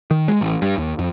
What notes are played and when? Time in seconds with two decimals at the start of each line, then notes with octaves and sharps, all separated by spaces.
0.11 D#3
0.28 G#3
0.41 A1
0.62 G2
0.78 D#2
0.99 F2